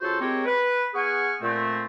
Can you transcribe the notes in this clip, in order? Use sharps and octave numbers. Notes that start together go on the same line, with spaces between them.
C#3 F4 F#4 A4 C5
G#3 C4 G4 A#4 C#5
B4
B3 G#4 F#5 G#5 C#6 F6
A#2 A3 C4